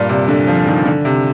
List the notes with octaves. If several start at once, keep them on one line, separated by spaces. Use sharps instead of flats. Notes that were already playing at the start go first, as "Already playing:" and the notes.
Already playing: G2 A#2
C3
D3
F3
D#3
D3
C3